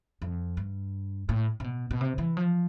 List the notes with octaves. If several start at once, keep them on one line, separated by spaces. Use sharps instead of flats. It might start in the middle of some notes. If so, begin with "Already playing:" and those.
F2
G2
A2
C3
B2
B2
C3
E3
F3